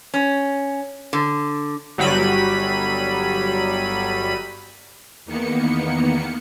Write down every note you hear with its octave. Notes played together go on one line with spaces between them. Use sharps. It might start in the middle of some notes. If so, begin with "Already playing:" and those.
C#4
D3
G1 F#3 G3 B5 D#7
E2 D#3 A#3 B3 C#7